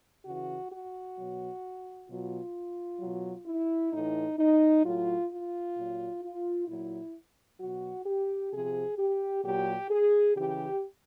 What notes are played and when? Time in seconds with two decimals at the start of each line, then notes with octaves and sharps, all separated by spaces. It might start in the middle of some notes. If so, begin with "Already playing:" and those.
0.25 C#3 E3 F#4
0.71 F#4
1.16 B2 F#3
2.08 B2 F#3 F4
3.00 B2 F#3
3.46 E4
3.91 A2 E3 D#4
4.38 D#4
4.84 A2 F#3 F4
5.30 F4
5.76 A#2 F#3
6.21 F4
6.67 A#2 F#3 E4
7.59 B2 F#3 F#4
8.05 G4
8.51 C3 F3 G#4
8.97 G4
9.43 A#2 F#3 G4
9.89 G#4
10.35 C#3 E3 G4